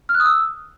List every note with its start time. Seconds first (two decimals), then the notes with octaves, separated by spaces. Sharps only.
0.09 F6
0.14 F#6
0.20 D#6
0.25 E6